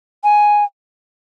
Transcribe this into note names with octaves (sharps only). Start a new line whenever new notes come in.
G#5